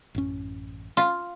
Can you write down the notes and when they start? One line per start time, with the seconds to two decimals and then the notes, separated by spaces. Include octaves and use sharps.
0.15 A1 F#2 C#4
0.97 F4